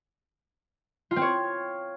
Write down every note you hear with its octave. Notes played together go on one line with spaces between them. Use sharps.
F4
C4
C#5